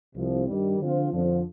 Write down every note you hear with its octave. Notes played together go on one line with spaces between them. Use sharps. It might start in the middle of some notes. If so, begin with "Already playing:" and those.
C2 C3 F3
G2 D#3 G3
D3 F3 C4 F4
F2 D3 F3